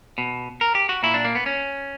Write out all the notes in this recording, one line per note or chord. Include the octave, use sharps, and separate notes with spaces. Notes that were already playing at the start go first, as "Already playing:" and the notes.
B2
A#4
G4
F#4
A#2 E4
D4
A#3
B3
C#4